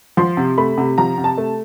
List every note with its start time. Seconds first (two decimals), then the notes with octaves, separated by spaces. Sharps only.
0.17 F3 C6
0.37 C3
0.58 A3 B5
0.78 C3
0.98 F3 A#5
1.18 C3
1.24 A5
1.38 A3